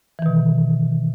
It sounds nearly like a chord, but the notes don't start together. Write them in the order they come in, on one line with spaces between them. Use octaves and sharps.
E3 D#3 B2